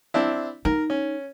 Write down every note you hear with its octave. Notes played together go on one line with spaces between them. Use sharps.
C4 D4 E4
D#4 A#4
C#4